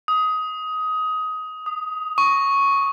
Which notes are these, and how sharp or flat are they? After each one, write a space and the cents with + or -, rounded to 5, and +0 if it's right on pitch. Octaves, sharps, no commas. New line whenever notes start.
D#6 +15
D#6 -10
C#6 +0